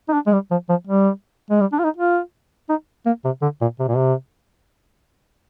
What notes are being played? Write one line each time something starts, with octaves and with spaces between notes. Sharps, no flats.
D#4
D4
G#3
G3
F3
F3
G3
G#3
G3
D4
F4
D#4
F4
D#4
A#3
C3
D3
A#2
C3
A#2
C3